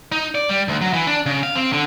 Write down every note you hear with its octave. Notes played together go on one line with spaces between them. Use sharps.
D#4
D5
G3
D2
F#3
E3
D4
C#3
F5
C4
D3